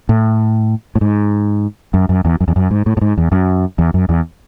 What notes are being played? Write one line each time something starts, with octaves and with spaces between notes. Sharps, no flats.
A2
A2
G#2
F#2
F#2
E2
F#2
E2
F#2
G#2
A2
A2
G#2
E2
F#2
E2
F#2
E2